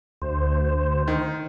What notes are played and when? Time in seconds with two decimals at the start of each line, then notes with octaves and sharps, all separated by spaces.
0.22 D2 C5
1.08 D#3